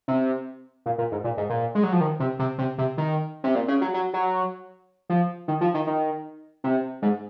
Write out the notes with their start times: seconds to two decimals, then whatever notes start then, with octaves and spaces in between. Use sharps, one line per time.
0.08 C3
0.86 A#2
0.98 A#2
1.12 G#2
1.24 A#2
1.37 G#2
1.50 A#2
1.75 G#3
1.83 F#3
1.92 F3
2.01 D#3
2.20 C3
2.39 C3
2.58 C3
2.78 C3
2.98 D#3
3.44 C3
3.55 A#2
3.68 C#3
3.81 F#3
3.94 F#3
4.14 F#3
5.10 F3
5.48 D#3
5.61 F3
5.74 D#3
5.87 D#3
6.64 C3
7.02 G#2